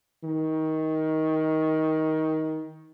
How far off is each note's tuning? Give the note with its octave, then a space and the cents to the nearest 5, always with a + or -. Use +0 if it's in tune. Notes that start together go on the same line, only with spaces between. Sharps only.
D#3 +20